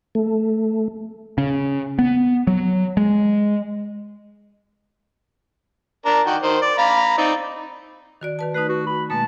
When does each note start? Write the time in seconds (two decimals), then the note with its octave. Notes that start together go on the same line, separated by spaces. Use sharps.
0.15 A3
1.38 C#3
1.99 B3
2.47 F#3
2.97 G#3
6.06 D4 A#4 A#5
6.26 D#3 F#4 G5
6.42 D#3 C5
6.62 D5
6.78 F5 A#5 B5
7.18 C4 D#4 D5
8.21 D#3 F#4 D5
8.39 D#3 B4 A5
8.54 A3 D#4 B4
8.69 F#4
8.87 B5
9.10 B2 G#3 A#3 A5